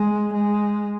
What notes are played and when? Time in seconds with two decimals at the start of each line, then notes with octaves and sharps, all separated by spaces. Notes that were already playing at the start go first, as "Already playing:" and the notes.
Already playing: G#3
0.34 G#3